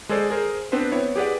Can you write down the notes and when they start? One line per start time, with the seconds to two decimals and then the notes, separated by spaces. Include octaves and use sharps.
0.09 G#3 G#4 A4 C5 D5
0.30 G#4 A#4 C5
0.72 B3 C4 D4 B4 C5
0.92 B3 E4 C#5
1.16 G4 G#4 B4 D5 F#5